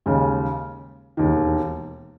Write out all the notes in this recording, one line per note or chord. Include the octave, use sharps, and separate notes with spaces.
D#2 C#3 G#3
E1 D#2 D#3